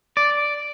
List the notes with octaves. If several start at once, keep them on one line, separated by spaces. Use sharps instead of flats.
D5